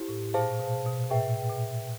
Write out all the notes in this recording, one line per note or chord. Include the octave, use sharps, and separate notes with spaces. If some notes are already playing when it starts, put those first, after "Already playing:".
Already playing: E4 G4 C5
A2
A#2 G#4 C5 F5 A5
B2
B2
A#2
A2 G#4 B4 E5 G5
A#2